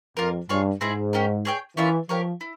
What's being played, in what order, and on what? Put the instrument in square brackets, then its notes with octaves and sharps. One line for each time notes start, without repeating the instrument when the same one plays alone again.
[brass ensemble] F2 [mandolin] A#3 F4 A#4
[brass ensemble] G2 [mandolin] F4 G#4 C#5
[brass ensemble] G#2 [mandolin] C4 E4 G#4 E5
[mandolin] C#4 G4 A#4
G#4 C#5 E5 G5
[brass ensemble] E3 [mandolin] C#4 F4 A#4 E5
[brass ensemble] F3 [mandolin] G4 A#4 C#5
[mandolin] E4